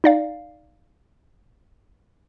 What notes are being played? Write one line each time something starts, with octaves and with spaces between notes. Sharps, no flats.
D#4 D5 F5